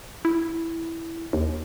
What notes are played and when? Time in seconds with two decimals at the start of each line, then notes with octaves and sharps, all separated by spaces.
0.25 E4
1.33 D#2